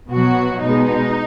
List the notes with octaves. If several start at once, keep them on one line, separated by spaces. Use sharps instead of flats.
B2 F#3 F#4
B2 G#3 D#4